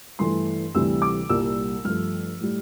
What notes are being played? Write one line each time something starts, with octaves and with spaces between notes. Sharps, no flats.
G2 E3 A3 C6
D2 C3 E3 G3 E6
D6
C2 A#2 G3 E6
G2 F3 A3 F6
A2 G3